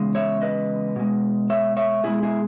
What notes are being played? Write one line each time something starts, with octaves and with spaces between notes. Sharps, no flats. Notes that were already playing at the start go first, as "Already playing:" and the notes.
Already playing: E2 C#3 G#3
C#5 E5
B4 D#5
B2 G#3
C#5 E5
C#5 E5
B2 G#3 E4 G#4
E4 G#4